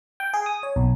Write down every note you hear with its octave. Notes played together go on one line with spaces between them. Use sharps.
G5
G#4
D#6
C#5
B1